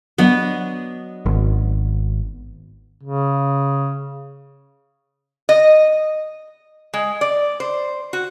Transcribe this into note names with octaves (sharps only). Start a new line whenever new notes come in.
F#3 B3 D4 D#5
G#1
C#3
D#5
G#3
D5
C5
F#4